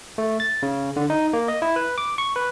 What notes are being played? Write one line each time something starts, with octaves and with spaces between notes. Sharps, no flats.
A3
A6
C#3
D3
D#4
A#3
D#5
E4
B4
D6
C#6
B4